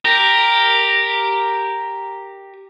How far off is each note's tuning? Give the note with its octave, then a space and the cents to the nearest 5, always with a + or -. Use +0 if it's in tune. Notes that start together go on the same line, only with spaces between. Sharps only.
G4 +0 A#4 +0